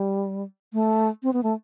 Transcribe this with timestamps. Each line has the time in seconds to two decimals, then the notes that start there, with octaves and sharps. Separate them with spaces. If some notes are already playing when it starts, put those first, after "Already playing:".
Already playing: G3
0.73 A3
1.23 C4
1.33 B3
1.43 A3